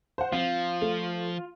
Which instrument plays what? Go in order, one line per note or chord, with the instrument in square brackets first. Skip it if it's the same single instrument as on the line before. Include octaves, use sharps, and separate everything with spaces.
[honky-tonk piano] C5 F#5
[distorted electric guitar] F3 [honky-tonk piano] C4 [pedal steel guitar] F4
[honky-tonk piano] A3